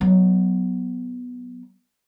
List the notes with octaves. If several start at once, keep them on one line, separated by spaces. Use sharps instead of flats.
F#3 B3